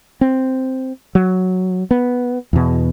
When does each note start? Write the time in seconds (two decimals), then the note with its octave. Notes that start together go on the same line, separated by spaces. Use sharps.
0.21 C4
1.15 F#3
1.91 B3
2.53 E2 B2